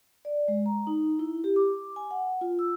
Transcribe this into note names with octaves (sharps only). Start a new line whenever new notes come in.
D5
G#3
A#5
D#4
E4
G4
D6
G#5
F#5
F4
E6